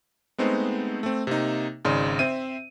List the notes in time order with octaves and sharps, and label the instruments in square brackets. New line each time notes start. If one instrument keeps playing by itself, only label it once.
[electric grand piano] G#3 A3 B3 C4 D#4 C5
A3 C4
C3 A#3 D#4
G#1 C#3 D#4 D5 C6
C4 C5 E5 D#7